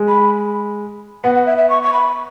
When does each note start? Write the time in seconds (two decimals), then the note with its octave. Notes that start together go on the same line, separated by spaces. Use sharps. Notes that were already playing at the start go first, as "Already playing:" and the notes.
Already playing: G#3
0.08 B5
1.24 B3 F#5
1.35 F#5
1.46 E5
1.58 E5
1.70 C#6
1.83 C#6
1.93 B5